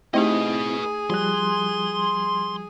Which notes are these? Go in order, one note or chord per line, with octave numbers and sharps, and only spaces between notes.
A3 C4 D#4 E4 G4 G#4 B4 D#5
F3 G3 C6 F#6